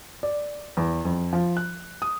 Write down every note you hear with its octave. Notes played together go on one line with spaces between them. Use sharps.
D5
E2
F2
F3
F#6
D#6